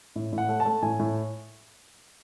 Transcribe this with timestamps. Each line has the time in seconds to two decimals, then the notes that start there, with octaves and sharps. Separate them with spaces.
0.16 A2
0.32 A2
0.38 F#5
0.49 A3
0.60 A5
0.65 A3
0.82 A2 G#5
0.99 A2